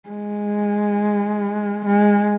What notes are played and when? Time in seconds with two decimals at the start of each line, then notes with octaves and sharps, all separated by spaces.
0.09 G#3
1.86 G#3